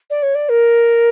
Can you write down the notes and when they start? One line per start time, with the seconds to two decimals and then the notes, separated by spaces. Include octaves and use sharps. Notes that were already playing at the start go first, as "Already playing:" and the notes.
0.10 D5
0.22 C#5
0.35 D5
0.49 A#4